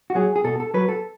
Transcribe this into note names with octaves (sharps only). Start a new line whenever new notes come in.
F#4
F#3 G#4
G#4
B2 A4
A4
F#3 B4
A4